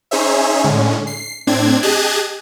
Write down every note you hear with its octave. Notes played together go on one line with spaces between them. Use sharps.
C#4 D#4 G#4 C5 C#5 E5
A2 D3 G#3 C#4
C7
A2 C4 D4 G#6
G4 G#4 D#5 A5 F#6 G#6